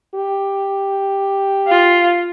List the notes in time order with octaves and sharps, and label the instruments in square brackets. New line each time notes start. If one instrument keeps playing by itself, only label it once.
[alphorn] G4
[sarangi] F4